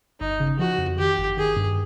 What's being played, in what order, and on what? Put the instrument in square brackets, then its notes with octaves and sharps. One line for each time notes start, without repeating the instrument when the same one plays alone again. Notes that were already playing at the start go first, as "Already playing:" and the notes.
[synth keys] G1 [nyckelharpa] D#4
[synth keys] C#3
[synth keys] F3 [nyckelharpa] F#4
[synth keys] F2
[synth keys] D#3 [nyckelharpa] G4
[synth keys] G1
[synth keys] D#3 [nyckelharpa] G#4
[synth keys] G2